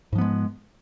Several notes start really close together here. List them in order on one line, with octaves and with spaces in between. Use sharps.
G#2 F3 B3 G#3